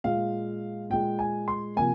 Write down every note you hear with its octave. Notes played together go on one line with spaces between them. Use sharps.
A#2 G#3 F5
A#2 G#3 G5
G#5
C6
C3 F3 A#3 G#5